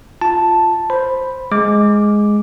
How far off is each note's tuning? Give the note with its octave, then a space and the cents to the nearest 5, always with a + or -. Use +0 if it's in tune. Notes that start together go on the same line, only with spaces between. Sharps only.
F4 +0 A5 +0
C5 +0 B5 +0
G#3 +0 D6 +0